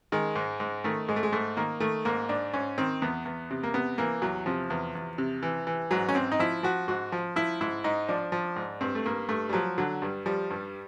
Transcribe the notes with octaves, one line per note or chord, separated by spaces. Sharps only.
D#3 G#3
G#2
G#2
D#3 A3
G#2 G#3
A3
G#3
G#2 A3
D#3 A#3
D#3 A3
G#2 A#3
G#2 D4
G#2 C#4
D#3 C4
E2 B3
E2
C3
A#3
C3 B3
E3 A#3
E2 F#3
C3 F3
E2
E2
C3
E3
E3
G#2 F#3
C#4
G#2 C4
D#4
F3 E4
F3 F#4
G#2 F#4
F3
F3 E4
G#2 E4
G#2 D#4
F3 D4
F3
G#2
G2 C4
A3
G2 A#3
G2 A3
G3
F3 F#3
D3 F#3
G2 G3
F3 G3
G2